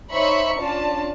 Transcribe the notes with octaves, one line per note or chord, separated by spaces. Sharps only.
D#4 C5 C#5 E5 B5 C#6
C#4 D4 F4 D5 A5